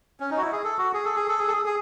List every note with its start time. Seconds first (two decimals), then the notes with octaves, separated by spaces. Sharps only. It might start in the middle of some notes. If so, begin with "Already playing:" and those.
0.20 C#4
0.31 D#4
0.37 F#4
0.41 E4
0.52 G#4
0.64 A4
0.78 F#4
0.94 G#4
1.05 A4
1.16 G#4
1.28 A4
1.39 G#4
1.48 A4
1.54 G#4
1.65 G#4